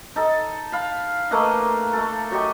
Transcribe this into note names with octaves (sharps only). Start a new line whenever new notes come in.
D#4 A4
F5 B5
A3 A#3 B4 D#5
A3 A4
F#3 G4 D#5 C#6